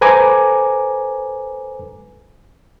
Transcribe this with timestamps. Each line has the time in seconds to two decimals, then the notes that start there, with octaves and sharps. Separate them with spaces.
0.01 A4 B4 C5 G#5 A#5 D6